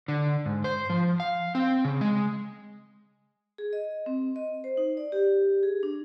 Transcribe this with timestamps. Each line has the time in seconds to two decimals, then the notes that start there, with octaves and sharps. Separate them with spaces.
0.08 D3
0.46 G#2
0.64 C5
0.90 F3
1.20 F5
1.55 C4
1.85 C#3
2.01 G#3
3.58 G#4
3.73 D#5
4.06 C4
4.36 D#5
4.64 C5
4.77 D#4
4.97 D5
5.12 G4
5.63 G#4
5.83 D4